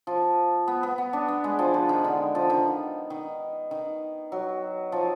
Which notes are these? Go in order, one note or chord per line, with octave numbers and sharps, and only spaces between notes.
F3
B3
B3
B3
D4
B3
G#3
F3
F3
D#3
D3
F3
D#3
D#3
D#3
F#3
F3